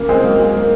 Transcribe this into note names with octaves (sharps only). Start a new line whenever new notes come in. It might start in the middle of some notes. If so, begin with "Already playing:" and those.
Already playing: C#3 A#3
G#3 C4
F#3 A#3
G#3
A#3